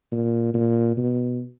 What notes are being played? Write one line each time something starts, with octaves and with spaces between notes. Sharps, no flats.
A#2
A#2
B2